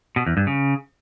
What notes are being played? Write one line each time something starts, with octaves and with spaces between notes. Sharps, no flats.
B2
E2
G2
C#3